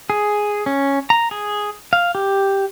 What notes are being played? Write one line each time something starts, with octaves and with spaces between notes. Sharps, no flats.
G#4
C#4
A#5
G#4
F5
G4